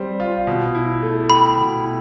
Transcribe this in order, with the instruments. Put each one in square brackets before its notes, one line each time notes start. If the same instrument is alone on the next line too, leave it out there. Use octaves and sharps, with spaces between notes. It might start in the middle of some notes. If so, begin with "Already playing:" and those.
Already playing: [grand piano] G3 C4 C5
F4
B2
E4
A3
[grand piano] G4 [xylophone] B5
[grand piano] B2
E4